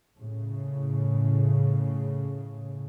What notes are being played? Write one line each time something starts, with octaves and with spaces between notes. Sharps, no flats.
A2 C#3